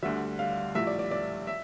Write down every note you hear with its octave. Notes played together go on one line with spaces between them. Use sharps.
D2 D3 G3 E5
F5
A#1 A2 G3 E5
D5
D5
D5
E5